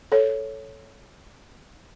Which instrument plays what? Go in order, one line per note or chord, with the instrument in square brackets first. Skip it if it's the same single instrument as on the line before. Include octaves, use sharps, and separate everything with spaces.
[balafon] A4 C#5